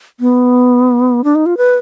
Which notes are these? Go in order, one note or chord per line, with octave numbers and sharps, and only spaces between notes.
B3
D4
D#4
F4
B4